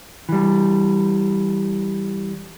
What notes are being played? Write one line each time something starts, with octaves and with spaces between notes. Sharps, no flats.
E3 G3